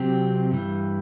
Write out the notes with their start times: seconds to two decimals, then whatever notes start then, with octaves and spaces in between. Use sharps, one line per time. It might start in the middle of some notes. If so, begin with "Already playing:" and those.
Already playing: C3 F#3 C4 G4
0.51 G2 E3 G3